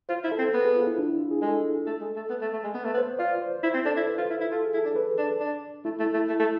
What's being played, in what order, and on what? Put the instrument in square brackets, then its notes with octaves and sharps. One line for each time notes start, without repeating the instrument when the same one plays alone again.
[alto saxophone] F4 [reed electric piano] C5
[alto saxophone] E4
[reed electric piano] A4
[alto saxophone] C4
[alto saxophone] B3 [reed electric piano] B4
[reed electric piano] G#4
F4
E4
D4
E4
F4
G#4
[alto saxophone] G#3 [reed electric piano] A4
[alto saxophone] A3
G#3
A3
B3
A3
A3
G#3
[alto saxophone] B3 [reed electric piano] B4
[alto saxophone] A3
B3
[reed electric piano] C5
[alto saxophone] F4 [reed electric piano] D5
[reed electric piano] C5
[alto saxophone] E4 [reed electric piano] C5
[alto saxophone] C4
[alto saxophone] D4 [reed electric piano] A4
[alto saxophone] E4
[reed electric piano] B4
[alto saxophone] F4
E4
E4
[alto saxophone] F4 [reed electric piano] A4
[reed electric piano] G#4
[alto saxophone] E4
[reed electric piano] A4
[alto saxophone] D4
[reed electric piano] B4
[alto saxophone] D4
D4
[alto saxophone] A3 [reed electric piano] E4
[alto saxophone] A3
[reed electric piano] E4
[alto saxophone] A3
A3
A3